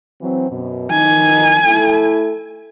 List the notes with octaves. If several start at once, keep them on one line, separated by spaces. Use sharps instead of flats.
E3 F#3 C4
F#2 B2
D#3 D#4 G#5
A3 E4 A4